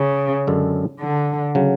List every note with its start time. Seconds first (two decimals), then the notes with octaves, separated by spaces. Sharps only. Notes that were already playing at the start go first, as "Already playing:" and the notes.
Already playing: C#3
0.47 F#2 D3 G#3 D4 A4
1.01 D3
1.55 C#3 F#3